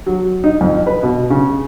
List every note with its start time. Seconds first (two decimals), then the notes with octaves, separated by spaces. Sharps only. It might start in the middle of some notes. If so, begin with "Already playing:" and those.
0.06 F#3
0.44 D#4
0.61 F2
0.87 B4
1.03 B2
1.30 C#3